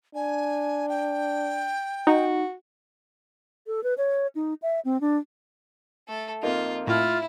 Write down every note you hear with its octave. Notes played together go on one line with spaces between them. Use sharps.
D4 G#5
G5
D#4 F#4
A4
B4
C#5
D#4
E5
C4
D4
A3 A4
F2 A#3 D#4 F4
A2 E4 F4